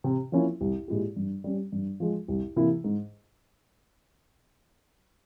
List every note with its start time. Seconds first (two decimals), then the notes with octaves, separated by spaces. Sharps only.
0.04 C3
0.32 F3 A#3 C#4 E4
0.61 C2
0.88 A#2 G#3 E4 G4
1.16 G2
1.44 G3 C#4
1.72 G2
2.00 F3 G#3
2.28 C2
2.56 C3 E3 A#3 E4
2.84 G#2